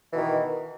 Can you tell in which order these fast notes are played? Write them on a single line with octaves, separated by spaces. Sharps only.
E3 B2 D#3